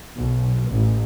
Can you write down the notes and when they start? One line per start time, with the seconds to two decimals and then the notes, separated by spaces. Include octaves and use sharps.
0.16 B1
0.67 A1